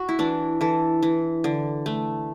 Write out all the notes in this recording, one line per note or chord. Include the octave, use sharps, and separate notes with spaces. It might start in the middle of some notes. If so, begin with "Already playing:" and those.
Already playing: F#4
E4
E3 D4
E3 A4
E3
D3
A3